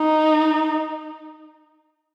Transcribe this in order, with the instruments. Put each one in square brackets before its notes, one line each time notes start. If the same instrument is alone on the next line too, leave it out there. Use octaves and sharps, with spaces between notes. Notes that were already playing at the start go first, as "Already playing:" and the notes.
Already playing: [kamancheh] D#4